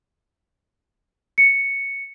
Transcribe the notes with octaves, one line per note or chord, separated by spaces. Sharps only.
C#7